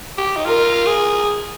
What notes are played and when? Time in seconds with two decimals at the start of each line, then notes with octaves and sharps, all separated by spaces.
0.18 G4
0.37 D#4
0.46 F4 A#4
0.87 G#4